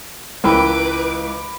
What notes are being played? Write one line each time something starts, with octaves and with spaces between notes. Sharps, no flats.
C#2 E3 A#4 B4 G5 B5 D6 E6